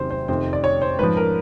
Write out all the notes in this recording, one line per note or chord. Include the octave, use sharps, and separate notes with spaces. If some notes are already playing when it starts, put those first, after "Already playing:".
Already playing: E2 C3 D#3 F#3 C5
C5
F2 C3 D#3 C5
D5
C#5
C5
G#2 F3 B4
A#4